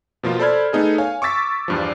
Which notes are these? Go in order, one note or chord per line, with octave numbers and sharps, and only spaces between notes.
B2 F3 A#3 F4
A4 C5 D5 B5 F6 G#6
A3 B3 D#4 G#4 A4
C#5 F5 G#5
C#6 D6 E6 A6 B6
E2 G2 F3